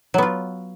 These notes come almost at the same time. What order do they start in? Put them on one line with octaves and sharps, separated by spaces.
F#3 B3 F4